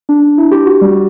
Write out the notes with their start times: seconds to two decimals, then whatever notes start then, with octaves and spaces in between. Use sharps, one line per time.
0.09 D4
0.38 E4
0.51 G4
0.66 F#4
0.81 G3